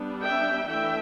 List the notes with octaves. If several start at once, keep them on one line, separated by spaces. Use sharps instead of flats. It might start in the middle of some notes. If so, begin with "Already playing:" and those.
Already playing: G3 B3 D4
E5 G5
E3 A3 D4 E5 G5